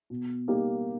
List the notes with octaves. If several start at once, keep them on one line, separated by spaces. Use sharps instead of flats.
B2
G3 A#3 D#4 G4